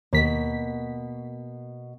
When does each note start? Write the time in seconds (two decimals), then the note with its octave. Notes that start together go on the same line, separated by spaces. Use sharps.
0.13 D#2 B2 A#3 B6